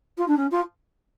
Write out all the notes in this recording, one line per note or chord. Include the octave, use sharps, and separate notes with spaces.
F4
D4
C#4
F4